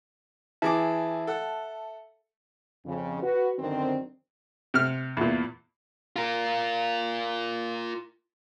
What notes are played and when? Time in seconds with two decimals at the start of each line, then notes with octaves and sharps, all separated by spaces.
0.62 E3 G#4 E5 A5 D6
1.27 A4 F#5
2.86 F2 C#3
3.23 F#4 B4
3.59 F#2 D3 D#3 C4
4.74 C3 F6
5.17 E2 A#2
6.16 F4 A#4